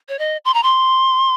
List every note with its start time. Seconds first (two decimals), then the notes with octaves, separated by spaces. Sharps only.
0.09 C#5
0.19 D#5
0.45 C6
0.54 A#5
0.63 C6